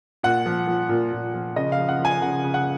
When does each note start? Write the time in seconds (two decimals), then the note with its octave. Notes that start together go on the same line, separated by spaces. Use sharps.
0.23 A#2 F#5
0.46 F3
0.67 F3
0.89 A#2
1.12 A#2
1.34 F3
1.56 C#3 D#5
1.72 F5
1.78 F3
1.89 F#5
1.99 F3
2.05 G#5
2.22 C#3 F#5
2.44 C#3
2.54 F#5